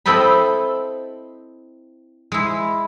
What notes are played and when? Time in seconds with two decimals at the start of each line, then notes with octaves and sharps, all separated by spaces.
0.06 C4 E4 A4 C5 D#5 B5
2.32 G#3 E4